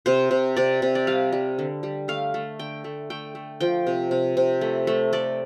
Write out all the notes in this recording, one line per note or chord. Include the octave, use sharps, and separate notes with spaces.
C3 C5
C3
C3 D5
C3
D5
G3 F5
G3
D3
G3
A3 F5
A3
D3 G5
A3
A3 G5
A3
F3 G5
C3
C3
C3
A3
A3
A3 D5